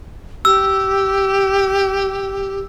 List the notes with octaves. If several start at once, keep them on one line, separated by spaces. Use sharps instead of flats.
G4 E6